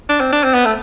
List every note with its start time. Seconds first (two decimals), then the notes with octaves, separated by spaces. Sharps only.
0.09 D4
0.20 C4
0.32 D4
0.43 C4
0.54 B3
0.65 A3